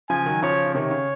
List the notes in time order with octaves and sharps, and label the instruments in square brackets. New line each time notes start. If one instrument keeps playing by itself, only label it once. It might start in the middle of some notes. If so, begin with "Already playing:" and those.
[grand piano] C#3 F3 [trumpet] G#5
[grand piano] D#3 F#3
[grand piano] C#3 F3 [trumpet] C#5
[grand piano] C#3
[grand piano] C3 D#3 [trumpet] C#5
[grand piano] C#3